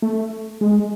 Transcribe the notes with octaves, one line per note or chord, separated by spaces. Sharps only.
A3
G#3